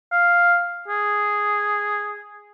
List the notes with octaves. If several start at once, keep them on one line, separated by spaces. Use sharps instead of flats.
F5
G#4